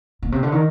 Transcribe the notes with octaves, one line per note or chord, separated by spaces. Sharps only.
A#2
C3
D3
D#3